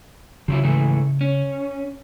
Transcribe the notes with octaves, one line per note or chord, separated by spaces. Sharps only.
C#3 F3 F#3 E4
G#2 E3 A3
C#4